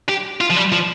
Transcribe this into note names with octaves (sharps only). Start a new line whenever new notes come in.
G4
F4
F3
G3
F3